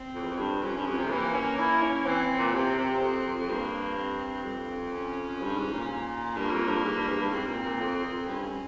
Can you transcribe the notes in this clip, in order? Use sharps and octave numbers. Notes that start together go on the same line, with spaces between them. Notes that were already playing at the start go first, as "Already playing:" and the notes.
Already playing: C4
F2
E2
F2
G2
F2 C#4
G2
F2
C3
E3 A#3
C#4
E4
C#4
E3 C4
A#2
C3 C4
C3
F2
F2
F2
G2 A#3
C4
F2
C#4
G2
G#2
A#2
G2 A#3
F2
G2
G#2
G2
E2
G2
G#2 C4
A#2
A#2
F2
F2
G2 C#4